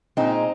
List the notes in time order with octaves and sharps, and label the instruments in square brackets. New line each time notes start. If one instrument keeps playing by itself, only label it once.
[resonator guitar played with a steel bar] A#2 G#3 C4 D#4